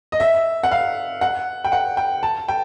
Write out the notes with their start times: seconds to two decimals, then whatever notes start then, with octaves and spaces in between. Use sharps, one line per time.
0.12 D#5
0.20 E5
0.63 F#5
0.71 F5
1.21 F#5
1.64 G5
1.72 F#5
1.97 G5
2.23 A5
2.48 G5